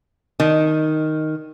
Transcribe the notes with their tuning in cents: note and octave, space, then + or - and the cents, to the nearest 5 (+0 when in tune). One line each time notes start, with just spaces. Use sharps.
D#3 +0